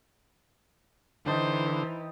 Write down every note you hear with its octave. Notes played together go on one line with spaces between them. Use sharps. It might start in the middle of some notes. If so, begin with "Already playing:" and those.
D3 E3 D#4 C5 G5 A5